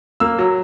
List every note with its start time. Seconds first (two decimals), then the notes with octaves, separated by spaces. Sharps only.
0.20 A#3 E6
0.39 F#3